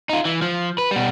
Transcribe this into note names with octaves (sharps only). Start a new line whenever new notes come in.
D#4 F4
E3
F3
B4
B2 G3